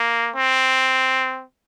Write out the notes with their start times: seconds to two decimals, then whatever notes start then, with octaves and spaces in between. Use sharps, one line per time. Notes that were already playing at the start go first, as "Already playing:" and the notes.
Already playing: A#3
0.36 C4